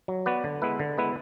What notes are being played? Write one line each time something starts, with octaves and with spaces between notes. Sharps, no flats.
F#3
B3 F#4 B4 D5
D3
G#3 B3 E4 B4
D3
G#3 B3 E4 B4